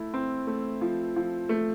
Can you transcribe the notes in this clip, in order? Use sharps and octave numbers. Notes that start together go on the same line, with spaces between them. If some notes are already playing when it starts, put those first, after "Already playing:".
Already playing: A3 E4
C4
A3
F3
F3
A3